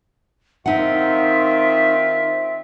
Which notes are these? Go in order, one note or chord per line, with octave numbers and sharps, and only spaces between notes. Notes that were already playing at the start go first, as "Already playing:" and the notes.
D#3 C4 D#4 F4 E5 F#5